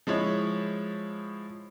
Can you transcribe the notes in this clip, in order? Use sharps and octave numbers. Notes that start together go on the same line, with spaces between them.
F3 G#3 E4 C#5